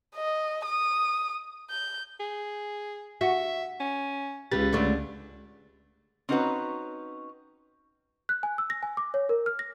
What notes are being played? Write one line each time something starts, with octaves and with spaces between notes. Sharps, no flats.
D#5
D#6
G6
G#4
F#4 E5
C#4
C#2 C#3 G4 B4 A6
D3 A3 D5
C4 C#4 D#4 F#4 B4 C#5
F#6
G#5
E6
A#6
G#5
D6
C#5
A#4
F6
A#6